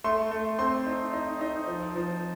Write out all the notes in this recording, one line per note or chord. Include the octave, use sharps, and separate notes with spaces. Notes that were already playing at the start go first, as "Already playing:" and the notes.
A3 C6
A3
C4 C6
D#4
D#4
D#4
F3
F3